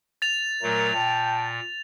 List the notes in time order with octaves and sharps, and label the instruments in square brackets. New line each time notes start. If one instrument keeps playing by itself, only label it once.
[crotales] A6 F7
[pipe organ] A#2 F#3 A3 [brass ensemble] A#4
[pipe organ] A#2 [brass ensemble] G5 A5